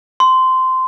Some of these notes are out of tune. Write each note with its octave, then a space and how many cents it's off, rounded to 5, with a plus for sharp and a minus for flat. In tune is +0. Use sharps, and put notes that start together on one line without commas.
C6 -15